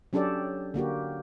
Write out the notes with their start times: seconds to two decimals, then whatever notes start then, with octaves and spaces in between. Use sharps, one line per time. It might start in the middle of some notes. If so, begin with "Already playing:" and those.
0.13 F#3 C#4 D4 G4 A4 D5
0.74 D3 A#3 F#4 G4